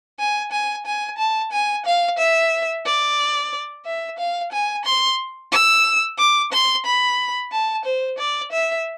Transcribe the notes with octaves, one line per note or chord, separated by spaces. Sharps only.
G#5
G#5
G#5
A5
G#5
F5
E5
D5
E5
F5
G#5
C6
E6
D6
C6
B5
A5
C5
D5
E5